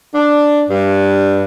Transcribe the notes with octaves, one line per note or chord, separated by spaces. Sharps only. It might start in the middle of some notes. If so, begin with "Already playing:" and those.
D4
G2